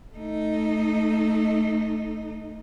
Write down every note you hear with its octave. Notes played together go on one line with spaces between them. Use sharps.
A3 D#4